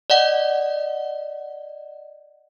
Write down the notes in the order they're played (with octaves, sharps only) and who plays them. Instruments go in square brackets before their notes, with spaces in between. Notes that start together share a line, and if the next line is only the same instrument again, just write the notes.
[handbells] D5 D#5 F#5